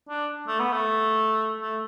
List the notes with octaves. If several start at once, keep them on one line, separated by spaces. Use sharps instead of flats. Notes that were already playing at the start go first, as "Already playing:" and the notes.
D4
A3
B3
A3
A3